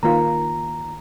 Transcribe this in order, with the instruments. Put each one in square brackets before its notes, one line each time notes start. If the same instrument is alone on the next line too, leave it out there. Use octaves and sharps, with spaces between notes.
[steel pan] D#3 A#3 F4 [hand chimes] A#5